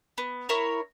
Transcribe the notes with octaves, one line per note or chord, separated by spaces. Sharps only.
B3
E4 A#4 C#5